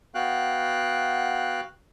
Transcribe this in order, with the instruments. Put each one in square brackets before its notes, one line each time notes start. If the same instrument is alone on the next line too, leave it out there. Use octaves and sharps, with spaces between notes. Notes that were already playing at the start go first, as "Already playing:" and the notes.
[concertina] B3 F#4 F5 G5 F#6